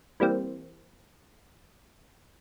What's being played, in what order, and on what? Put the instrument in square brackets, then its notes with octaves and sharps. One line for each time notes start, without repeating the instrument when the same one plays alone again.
[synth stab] E3 G3 A#3 C4